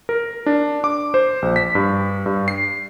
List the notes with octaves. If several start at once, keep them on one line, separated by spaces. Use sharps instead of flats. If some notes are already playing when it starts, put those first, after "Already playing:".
A#4
D4
D6
C5
A#1
B6
G2
G2
C7